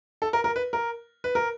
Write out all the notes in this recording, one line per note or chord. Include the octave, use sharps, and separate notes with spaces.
A4
A#4
A#4
B4
A#4
B4
A#4